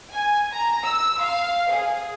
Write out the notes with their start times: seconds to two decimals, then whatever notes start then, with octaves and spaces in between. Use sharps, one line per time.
0.13 G#5
0.53 A#5
0.85 E6
1.21 F5
1.71 G#4